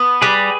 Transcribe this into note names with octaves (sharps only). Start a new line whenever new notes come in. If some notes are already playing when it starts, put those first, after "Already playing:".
Already playing: B3
G3 G#4 B4